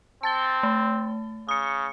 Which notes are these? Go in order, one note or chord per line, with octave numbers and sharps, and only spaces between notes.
C4 A5 A6 G7
A3
C#3 D#6 C#7